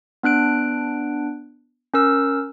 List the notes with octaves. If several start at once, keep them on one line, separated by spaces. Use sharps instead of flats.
B3 D4 F#6 D7
C#4 A#4 E6